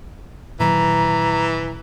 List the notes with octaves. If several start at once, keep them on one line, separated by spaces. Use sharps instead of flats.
A#2 D#3 E3 F#3 A#5